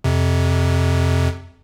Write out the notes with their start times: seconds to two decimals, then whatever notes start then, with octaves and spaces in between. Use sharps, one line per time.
0.04 F2 C3